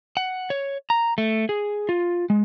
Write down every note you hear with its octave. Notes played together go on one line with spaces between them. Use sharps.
F#5
C#5
A#5
A3
G#4
F4
G#3